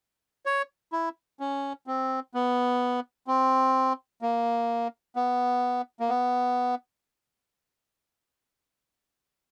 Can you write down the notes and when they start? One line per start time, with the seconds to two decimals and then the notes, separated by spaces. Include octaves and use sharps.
0.46 C#5
0.93 E4
1.40 C#4
1.87 C4
2.34 B3
3.27 C4
4.22 A#3
5.16 B3
6.00 A#3
6.09 B3